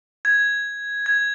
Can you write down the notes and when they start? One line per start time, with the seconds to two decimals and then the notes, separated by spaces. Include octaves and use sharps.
0.25 G#6
1.06 G#6